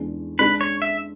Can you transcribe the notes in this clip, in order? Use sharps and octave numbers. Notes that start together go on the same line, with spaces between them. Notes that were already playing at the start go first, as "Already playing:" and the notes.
Already playing: E2 C#3 G#3 D4
C#3 G#3 D4 B4
C#5
E5